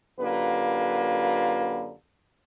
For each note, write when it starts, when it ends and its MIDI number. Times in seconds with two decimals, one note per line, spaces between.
0.19 1.92 42
0.19 1.92 50
0.19 1.92 58
0.19 1.92 65
0.19 1.92 67
0.19 1.92 71